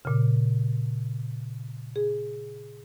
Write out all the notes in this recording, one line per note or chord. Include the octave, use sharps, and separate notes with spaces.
A#2 C#3
G#4